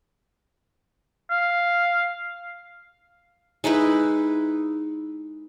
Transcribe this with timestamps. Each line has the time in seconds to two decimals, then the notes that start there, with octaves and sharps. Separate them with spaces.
1.31 F5
3.64 G#3 D#4 E4 B4